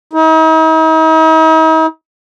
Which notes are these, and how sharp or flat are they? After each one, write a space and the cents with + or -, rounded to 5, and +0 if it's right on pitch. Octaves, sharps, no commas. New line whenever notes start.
D#4 +45